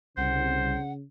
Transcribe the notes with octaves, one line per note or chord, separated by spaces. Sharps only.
C2 C#3 C5 F#5